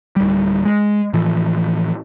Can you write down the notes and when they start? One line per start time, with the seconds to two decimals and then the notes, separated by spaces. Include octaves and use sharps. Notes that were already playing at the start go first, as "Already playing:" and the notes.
0.16 D1 G3
0.65 G#3
1.13 A2 E3 F3